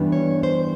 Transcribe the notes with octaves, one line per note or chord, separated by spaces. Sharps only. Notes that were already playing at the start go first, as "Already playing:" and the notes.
Already playing: G2 E3 G3 B3 D4
C#5
C5